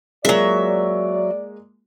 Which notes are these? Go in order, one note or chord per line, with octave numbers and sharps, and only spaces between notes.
F#3 G#3 A#3 F4 D5 E5